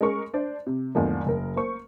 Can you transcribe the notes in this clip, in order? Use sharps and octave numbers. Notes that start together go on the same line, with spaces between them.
G#3 C#4 A#4 C#6
D4 C5 D5
C3
E2 G#2 D3 F3 A#3
F#1 A#4
A#3 C5 C#6